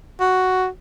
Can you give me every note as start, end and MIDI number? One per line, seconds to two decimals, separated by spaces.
0.21 0.66 66